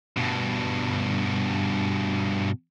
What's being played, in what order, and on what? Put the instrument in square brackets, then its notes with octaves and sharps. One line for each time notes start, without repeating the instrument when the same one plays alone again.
[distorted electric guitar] G2 B2